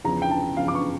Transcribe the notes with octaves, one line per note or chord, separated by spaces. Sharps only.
E2 C#3 F3 A#5
G5
A5
E2 C#3 F3 F5
D6
C#6